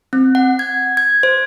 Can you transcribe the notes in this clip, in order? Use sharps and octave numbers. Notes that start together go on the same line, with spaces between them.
C4
F#5
G#6
G#6
C5